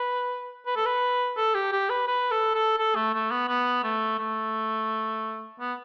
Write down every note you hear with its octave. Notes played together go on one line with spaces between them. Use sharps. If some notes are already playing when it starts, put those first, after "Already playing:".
Already playing: B4
B4
A4
B4
A4
G4
G4
B4
B4
A4
A4
A4
A3
A3
B3
B3
A3
A3
B3